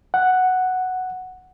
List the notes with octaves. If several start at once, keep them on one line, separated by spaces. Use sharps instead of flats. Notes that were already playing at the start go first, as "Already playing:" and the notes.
F#5